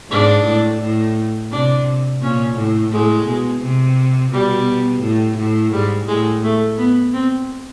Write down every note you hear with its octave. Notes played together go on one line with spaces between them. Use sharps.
G#2 D4
A2
A2
C3 D4
A#2 C#4
A2
A2 G#3
B2
C3
B2 G3
A2
A2
G#2 G3
A2 G#3
A3
B3
C4